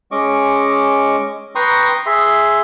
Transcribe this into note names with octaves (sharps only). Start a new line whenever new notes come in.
G#3 C#4 D#5 C#6 D6
B4 G5 A#5 C6 C#6 D#6
G#4 E5 C6